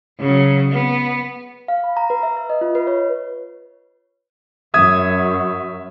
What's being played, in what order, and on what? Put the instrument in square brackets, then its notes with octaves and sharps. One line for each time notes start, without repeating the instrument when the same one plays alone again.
[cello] C#3 F#3
B3
[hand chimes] F5
B5
A#5
B4
E5
E5
D#5
F4
B4
C#5
[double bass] F#2 [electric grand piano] E5 D#6 G#6